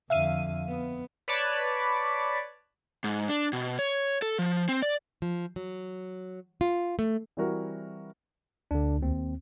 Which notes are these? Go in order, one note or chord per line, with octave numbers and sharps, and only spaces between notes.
F2 D3 E5 F5 D#7
B3
B4 C#5 D5 A5 B5
G#2
D4
B2
C#5
A4
F3
C4
D5
F3
F#3
F4
A3
E3 G3 C4 E4 F#4 A#4
D2 D3 D4
D#2 C4